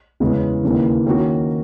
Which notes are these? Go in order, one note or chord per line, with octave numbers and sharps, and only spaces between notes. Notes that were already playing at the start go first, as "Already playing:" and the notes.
E2 C#3 E3 G#3 C#4
D#2 C#3 E3 A#3
D#3 A#3 C#4 F#4